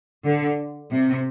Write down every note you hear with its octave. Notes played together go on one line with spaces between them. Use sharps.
D3
C3